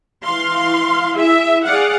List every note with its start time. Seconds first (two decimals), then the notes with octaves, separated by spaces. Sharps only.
0.22 E3 F5 C6
1.15 E4 G#4 E5
1.63 G#4 D5 F5 F#5